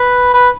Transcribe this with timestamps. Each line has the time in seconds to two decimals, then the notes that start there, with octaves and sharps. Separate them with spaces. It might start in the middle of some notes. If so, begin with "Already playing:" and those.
Already playing: B4
0.34 B4